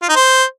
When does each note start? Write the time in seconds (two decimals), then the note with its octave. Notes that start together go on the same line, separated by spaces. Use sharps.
0.02 F4
0.09 D#4
0.15 C5